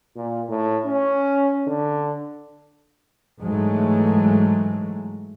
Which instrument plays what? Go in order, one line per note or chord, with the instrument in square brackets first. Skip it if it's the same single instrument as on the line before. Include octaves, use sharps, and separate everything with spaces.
[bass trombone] A#2
A2
C#4
D3
[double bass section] G#2 E3 F#3 G#3 A3